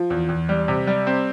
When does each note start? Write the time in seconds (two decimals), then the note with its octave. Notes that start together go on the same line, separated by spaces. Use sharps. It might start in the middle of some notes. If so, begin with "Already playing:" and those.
Already playing: F3
0.10 E2
0.29 E2
0.49 G3
0.68 C3
0.87 G3
1.07 C4